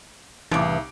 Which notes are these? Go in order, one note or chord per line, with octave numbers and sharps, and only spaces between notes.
C2 A2 C#3 E3 D#4 D6 D7